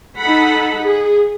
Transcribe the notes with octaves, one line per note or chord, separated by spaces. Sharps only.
D#4 A4 F#5 B5
G#4